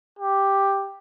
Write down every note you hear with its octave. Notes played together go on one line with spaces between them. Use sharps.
G4